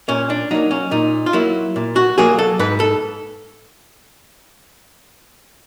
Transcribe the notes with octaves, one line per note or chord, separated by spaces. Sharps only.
A#2 C#4
D4
F#3 A#3 D#4
C#4
A#2 D#4
F4
F#3 A#3 E4
A#2
F#4
F#3 A#3 G#4
A4
G#2 B4
A4